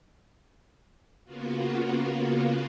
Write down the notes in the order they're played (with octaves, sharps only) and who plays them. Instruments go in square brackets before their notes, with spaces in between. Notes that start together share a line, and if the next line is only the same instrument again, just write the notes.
[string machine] C#3 A#3 B3 F4 F#4